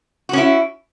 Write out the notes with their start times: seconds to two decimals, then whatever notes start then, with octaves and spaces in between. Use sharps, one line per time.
0.29 F#4
0.33 C#4
0.38 E4